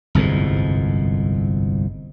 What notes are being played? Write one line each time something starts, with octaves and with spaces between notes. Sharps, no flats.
G1 C2 F2 G#2